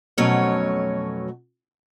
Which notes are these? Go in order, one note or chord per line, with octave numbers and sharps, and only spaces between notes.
F2 B2 F#3 A3 C#4 C#5